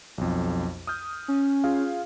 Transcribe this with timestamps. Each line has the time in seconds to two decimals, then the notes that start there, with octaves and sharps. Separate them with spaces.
0.18 B1 F2
0.87 D#6 F6 G6
1.28 C#4
1.64 F4 G#4 F5